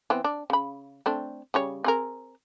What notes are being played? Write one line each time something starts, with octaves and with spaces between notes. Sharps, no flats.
E3 B3 C4
D4
C#3 B5
A3 C4 D4
C#3 G3 C#5
C4 G#4 A#4